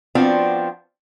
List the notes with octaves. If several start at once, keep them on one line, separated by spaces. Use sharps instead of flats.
F3 B3 C4 D4 F4 F#4